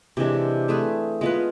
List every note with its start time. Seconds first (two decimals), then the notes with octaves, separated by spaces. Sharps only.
0.17 C3 E3 G#3 D4
0.68 A3 C4 G#4 B4
1.21 G#3 B3 F4 B4